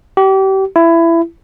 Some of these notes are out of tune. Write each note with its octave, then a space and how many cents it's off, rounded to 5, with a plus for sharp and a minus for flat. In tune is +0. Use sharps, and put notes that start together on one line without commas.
G4 -30
E4 +20